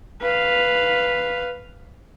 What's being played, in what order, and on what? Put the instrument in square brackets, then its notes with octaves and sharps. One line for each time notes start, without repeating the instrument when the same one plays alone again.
[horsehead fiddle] B4 F5